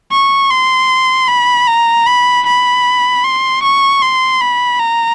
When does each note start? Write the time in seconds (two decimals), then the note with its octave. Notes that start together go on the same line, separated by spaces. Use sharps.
0.12 C#6
0.51 C6
1.29 B5
1.68 A#5
2.07 B5
2.46 B5
3.24 C6
3.63 C#6
4.02 C6
4.41 B5
4.80 A#5